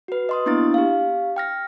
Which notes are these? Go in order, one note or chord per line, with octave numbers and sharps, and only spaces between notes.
F#4 B4
D#5 C6 D#6
A#3 B3 D4 E4 A6
G4 F5
G5 F6 A#6